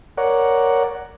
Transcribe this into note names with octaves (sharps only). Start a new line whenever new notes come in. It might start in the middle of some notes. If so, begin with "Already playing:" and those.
A#4 C#5 D5 F#5